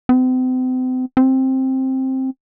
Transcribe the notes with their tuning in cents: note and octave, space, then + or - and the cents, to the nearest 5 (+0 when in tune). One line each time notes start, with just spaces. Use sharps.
C4 -40
C4 +10